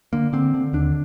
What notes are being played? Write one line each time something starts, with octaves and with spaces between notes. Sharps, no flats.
D3 A#3
D3 C4
D3
D#2 D4